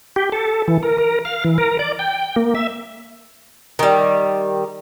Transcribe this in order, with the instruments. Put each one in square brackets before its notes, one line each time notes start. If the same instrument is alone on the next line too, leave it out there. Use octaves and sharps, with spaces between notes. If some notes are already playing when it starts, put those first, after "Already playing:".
[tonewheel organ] G4
A4
E3
A#4
A#4
F5
E3
A#4
D5
G5
A#3
E5
[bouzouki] D#3 G3